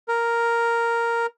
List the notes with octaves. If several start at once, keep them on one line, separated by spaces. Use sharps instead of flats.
A#4